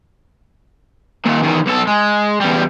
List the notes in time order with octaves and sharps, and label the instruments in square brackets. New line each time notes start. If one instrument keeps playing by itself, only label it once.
[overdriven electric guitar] D#2 A#2
E2 D#3
B1 A4
G#3
E2 G3